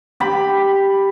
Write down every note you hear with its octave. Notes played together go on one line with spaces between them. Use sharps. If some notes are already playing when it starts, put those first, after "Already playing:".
G4 B5